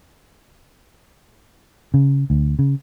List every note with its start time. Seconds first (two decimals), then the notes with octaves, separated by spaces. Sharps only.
1.94 C#3
2.30 D2
2.59 C#3